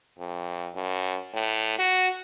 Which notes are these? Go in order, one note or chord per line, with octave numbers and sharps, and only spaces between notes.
F2
F#2
A2
F#4